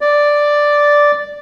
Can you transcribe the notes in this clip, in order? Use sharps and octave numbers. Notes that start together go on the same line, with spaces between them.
D5